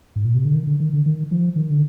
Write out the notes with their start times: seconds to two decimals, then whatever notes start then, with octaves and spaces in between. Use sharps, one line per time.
0.16 G#2
0.25 A#2
0.35 C3
0.45 D3
0.54 D#3
0.67 D3
0.80 D#3
0.93 D3
1.06 D#3
1.31 F3
1.56 D#3
1.70 D3